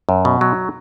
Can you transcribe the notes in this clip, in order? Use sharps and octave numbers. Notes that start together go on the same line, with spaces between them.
F#2
B2
F#3